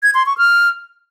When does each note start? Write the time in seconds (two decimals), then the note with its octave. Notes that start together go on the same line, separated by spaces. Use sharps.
0.03 G#6
0.14 C6
0.26 C#6
0.38 F6